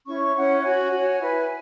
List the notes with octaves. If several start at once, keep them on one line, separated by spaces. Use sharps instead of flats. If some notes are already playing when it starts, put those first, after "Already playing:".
C#4 E4 C#5 C#6
C#4 E4 C#5 F#5
F#4 C#5 G#5
F#4 C#5
E4 B4